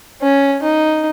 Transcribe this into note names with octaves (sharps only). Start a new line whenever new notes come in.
C#4
D#4